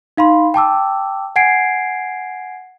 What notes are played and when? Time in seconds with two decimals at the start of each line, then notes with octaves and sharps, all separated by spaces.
0.17 D#4 F5 B5 C6
0.54 G5 A5 D6 E6
1.36 F#5 G#5 G#6 C7 D7